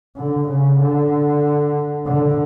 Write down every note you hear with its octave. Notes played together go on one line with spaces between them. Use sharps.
D3
C#3
D3
D3